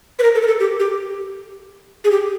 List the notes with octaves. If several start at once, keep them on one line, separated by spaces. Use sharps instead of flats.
B4
A#4
A4
A#4
A4
G4
G4
G#4
G4